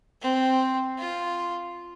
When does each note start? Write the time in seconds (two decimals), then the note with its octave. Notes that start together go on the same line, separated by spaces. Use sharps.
0.22 C4
0.99 F4